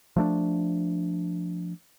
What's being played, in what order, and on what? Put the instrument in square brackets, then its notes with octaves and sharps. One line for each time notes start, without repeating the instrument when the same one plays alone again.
[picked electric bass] F3 A3 D4